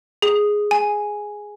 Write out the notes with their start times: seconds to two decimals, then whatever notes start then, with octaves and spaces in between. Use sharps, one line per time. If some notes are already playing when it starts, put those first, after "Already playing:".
0.22 G#4
0.71 G#5